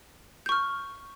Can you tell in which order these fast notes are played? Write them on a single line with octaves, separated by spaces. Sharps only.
G6 C#6 F6